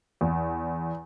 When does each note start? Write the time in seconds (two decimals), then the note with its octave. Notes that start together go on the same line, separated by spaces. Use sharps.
0.21 E2